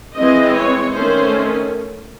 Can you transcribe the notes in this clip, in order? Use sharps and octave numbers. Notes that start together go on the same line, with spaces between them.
E3 G#3 C4 D#5
C#5
D#3 A3 C#4 C5